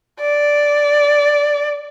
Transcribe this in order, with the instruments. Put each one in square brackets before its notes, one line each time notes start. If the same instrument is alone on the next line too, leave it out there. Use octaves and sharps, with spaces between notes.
[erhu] D5